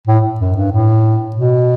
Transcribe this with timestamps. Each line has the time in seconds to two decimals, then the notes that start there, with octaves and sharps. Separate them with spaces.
0.08 A2
0.40 F#2
0.56 G2
0.72 A2
1.36 B2